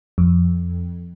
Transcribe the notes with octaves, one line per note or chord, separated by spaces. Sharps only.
F2